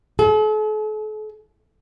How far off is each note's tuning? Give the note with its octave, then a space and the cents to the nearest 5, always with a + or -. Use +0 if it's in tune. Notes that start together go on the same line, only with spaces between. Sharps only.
A4 -45